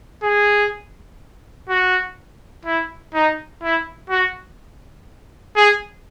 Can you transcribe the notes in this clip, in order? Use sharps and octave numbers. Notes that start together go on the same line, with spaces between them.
G#4
F#4
E4
D#4
E4
F#4
G#4